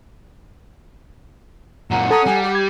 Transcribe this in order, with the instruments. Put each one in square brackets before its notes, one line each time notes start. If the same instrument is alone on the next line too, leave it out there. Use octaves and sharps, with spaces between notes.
[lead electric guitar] F#2 A#2 [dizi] F#5 [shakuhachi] A#5
[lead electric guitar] C#4 [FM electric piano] A4 A5 A#5 [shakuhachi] D#6
[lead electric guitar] G3 [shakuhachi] G#5
[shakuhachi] G4
[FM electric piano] G#6